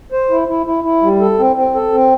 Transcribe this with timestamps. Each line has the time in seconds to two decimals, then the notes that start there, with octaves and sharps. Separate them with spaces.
0.12 C5
0.30 E4
0.48 E4
0.66 E4
0.84 E4
1.02 G3
1.20 A4
1.39 C4
1.56 C4
1.75 A4
1.92 C4